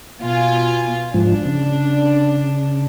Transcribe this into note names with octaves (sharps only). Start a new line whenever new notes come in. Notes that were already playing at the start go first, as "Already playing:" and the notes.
B2 F4 G#5
G#2 F3 D4
C#3